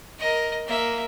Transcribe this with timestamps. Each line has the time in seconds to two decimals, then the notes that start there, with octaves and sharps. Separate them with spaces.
0.19 A#4 D#5
0.67 A#3 E5